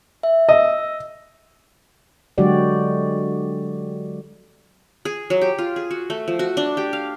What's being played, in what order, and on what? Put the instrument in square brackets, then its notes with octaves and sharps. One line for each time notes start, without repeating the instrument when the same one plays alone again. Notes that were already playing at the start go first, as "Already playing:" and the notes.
[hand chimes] E5
[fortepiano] D#5 [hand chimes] E6
[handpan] D3 F#3 G#3 F#4 G4 D5
[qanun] G#4
F#3
G4
F4
G#4
F#4
A3
F3
F#4
D4
G4
F5